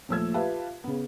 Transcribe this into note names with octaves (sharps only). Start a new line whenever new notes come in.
D#2 A#2 F3 A3 E6 G#6
F4 G4 B4 E5 F5 A5
C#3 B3